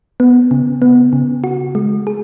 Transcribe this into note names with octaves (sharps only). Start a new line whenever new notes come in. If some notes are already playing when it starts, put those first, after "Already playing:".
B3
C#3
B3
C#3
F#4
G#3
G#4